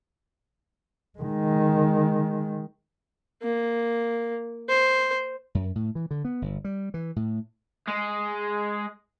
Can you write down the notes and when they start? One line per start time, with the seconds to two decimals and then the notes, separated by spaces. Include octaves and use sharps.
1.19 D#3 G#3
3.43 A#3
4.69 C5
5.55 F#2
5.75 A2
5.95 E3
6.11 D3
6.25 B3
6.42 G1
6.64 G3
6.94 E3
7.16 A2
7.87 G#3